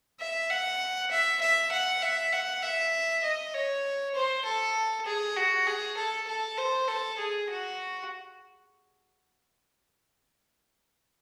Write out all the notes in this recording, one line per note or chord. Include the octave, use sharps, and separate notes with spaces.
E5
F#5
E5
E5
F#5
E5
F#5
E5
D#5
C#5
C5
A4
G#4
F#4
G#4
A4
A4
C5
A4
G#4
F#4